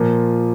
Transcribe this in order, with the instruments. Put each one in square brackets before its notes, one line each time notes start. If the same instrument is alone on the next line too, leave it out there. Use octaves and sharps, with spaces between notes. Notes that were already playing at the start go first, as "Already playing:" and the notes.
Already playing: [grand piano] A#2 F3